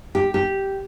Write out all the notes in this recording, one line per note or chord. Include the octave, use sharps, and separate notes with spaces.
G4
G4